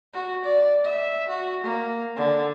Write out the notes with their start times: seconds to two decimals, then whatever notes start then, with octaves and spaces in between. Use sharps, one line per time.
0.14 F#4
0.45 D5
0.84 E5
1.28 F#4
1.63 A#3
2.17 D3